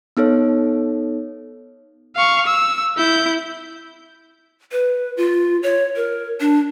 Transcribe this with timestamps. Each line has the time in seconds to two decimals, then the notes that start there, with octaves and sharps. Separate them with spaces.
0.17 B3 D#4 A4 C#5
2.16 F5 C#6
2.46 E6
2.97 E4 G6
4.72 B4
5.17 F4
5.63 C#5
5.96 A#4
6.40 D4